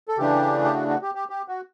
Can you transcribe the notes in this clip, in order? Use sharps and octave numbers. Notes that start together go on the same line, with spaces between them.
A4
C#3 E3 A3 D4 G4
G4
F#4
F#4
G4
G4
G4
F#4